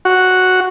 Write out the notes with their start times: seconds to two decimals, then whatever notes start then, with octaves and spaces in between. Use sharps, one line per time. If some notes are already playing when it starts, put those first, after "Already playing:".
0.05 F#4